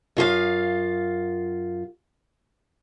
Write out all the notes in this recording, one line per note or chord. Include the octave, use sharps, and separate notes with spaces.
F#2 F4 G#4 F5